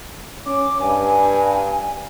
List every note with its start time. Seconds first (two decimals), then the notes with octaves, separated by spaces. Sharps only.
0.46 C#4 D6
0.80 G2 G#5